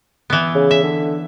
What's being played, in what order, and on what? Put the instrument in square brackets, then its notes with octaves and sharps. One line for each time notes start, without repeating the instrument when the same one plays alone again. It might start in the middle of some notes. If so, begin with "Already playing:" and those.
[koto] E3 B3
[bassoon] C#3
[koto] E5
[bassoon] D3